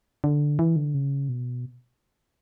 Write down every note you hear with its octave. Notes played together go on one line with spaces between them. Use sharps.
D3
E3
D3
C#3
B2